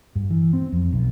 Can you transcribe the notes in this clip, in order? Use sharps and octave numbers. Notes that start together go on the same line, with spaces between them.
G2
E3
C4
F2
B1